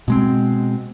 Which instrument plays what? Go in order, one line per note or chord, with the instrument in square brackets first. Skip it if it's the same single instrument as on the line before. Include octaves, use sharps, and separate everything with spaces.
[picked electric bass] B2 G#3 C4